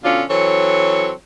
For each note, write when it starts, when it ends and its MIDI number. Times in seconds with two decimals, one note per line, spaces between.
0.03 0.23 47
0.03 0.23 50
0.03 0.23 61
0.03 0.23 62
0.03 0.23 65
0.29 1.11 52
0.29 1.11 54
0.29 1.11 60
0.29 1.11 69
0.29 1.11 73